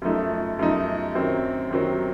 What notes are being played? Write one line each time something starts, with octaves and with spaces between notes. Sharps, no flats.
F#2 F3 A3 D#4
F#2 F3 A3 D#4
F#2 D#3 F#3 C4
F#2 D#3 F#3 C4